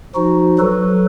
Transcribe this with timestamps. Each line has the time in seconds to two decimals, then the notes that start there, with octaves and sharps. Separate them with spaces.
0.15 F3 D#4 F#4
0.59 F#3 A4 B4